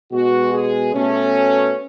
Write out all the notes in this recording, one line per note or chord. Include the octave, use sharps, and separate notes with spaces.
B2 G#3 F#4
G#4
B2 A3 C#4